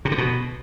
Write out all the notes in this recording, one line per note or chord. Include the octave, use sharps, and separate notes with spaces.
C3
D3
B2